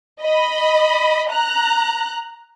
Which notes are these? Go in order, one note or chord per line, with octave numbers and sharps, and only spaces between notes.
D#5 B5
A#5 F#6